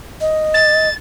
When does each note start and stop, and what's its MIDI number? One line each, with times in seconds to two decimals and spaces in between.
0.21 0.89 75
0.54 0.94 93